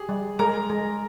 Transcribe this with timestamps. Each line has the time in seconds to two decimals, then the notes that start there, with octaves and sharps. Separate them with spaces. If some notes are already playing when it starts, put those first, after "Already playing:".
Already playing: G4 G#4
0.09 G3
0.39 G#3 A#4 A#5
0.70 G#3